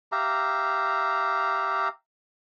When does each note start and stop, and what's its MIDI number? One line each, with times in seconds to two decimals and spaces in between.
0.12 1.88 67
0.12 1.88 76
0.12 1.88 77
0.12 1.88 82